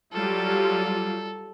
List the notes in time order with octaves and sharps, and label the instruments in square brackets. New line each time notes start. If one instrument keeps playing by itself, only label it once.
[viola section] F#3 G3 F4 [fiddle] A4